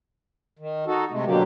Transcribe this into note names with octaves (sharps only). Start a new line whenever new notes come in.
D#3
D#4 F#4 A4
C3 G#3 A3
B2 D3 F#3 G3 A#3 G4